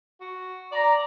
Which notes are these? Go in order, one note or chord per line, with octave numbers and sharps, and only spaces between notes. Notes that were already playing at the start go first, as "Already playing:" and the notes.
F#4
D5 A#5